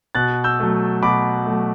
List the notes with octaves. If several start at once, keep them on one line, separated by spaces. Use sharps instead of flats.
B2 F#6 A6
E6 G6
F#3 A3
B2 B5 D6
F#3 A3